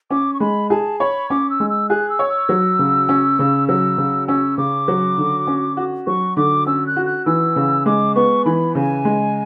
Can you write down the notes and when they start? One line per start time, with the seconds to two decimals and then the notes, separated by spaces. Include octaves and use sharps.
0.10 C#4 D6
0.34 C#6
0.40 G#3 B5
0.70 G#4 A5
1.00 C#5 B5
1.30 C#4 D6
1.50 E6
1.60 G#3
1.70 E6
1.89 G#4 F#6
2.10 E6
2.19 C#5
2.29 E6
2.49 F#3
2.79 C#3
3.09 C#4
3.39 C#3
3.68 F#3 E6
3.98 C#3
4.28 C#4 E6
4.58 C#3 D6
4.88 F#3
5.18 D3
5.47 C#4
5.77 F#4
6.07 F#3 C#6
6.37 D3 D6
6.66 C#4 E6
6.87 F#6
6.96 F#4
7.06 F#6
7.26 E3 E6
7.56 C#3
7.86 G#3 D6
8.15 B3 C#6
8.45 E3 B5
8.75 C#3 G#5
9.05 G#3